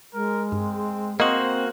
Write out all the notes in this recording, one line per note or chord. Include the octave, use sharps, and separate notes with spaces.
G#3 A#4
G2 C4
A#3 C4 F#4 C5 D#5 D#6